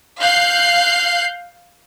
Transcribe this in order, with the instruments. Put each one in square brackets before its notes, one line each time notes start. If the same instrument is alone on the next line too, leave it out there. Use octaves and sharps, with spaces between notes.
[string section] F5 F#6 G6 C7